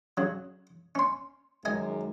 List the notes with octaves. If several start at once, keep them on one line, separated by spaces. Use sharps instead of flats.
C#3 F#3
C#4 C6
F#2 D#3 G#3 D#5 G#5